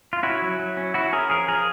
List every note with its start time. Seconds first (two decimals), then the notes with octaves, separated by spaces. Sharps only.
0.13 F4
0.23 C#4 E4 F#4
0.42 F#3
0.59 F#3
0.77 C#4
0.94 C#4 E4 F#4
1.13 C#4 G#4 A#4
1.30 F3 G#4 A#4
1.48 F3 G#4 A#4